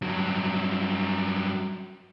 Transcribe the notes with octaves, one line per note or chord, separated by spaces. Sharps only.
G2 F#3